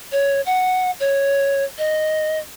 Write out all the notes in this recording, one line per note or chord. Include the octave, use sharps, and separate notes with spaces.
C#5
F#5
C#5
D#5